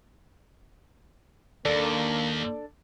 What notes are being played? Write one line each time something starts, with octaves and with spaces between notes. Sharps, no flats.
D#2 A#3 D4 A4 D5